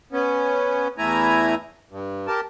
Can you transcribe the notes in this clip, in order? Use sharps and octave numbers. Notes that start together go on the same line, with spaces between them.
B3 C#4
E2 A3 E4 G#5 A#5
G2
G4 A#4 A5